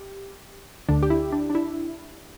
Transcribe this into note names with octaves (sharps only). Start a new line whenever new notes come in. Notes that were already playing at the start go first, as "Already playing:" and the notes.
Already playing: G4
D2 D3 D4
G4
E4
D4
D4
E4